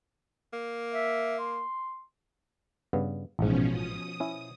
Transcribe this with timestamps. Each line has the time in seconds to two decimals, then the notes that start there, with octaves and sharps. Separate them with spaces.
0.53 A#3
0.92 E5
1.39 C6
2.93 G2 C#3 B3
3.39 A1 G#2 B2 F3 C#4
3.72 D#6
4.20 C#4 E4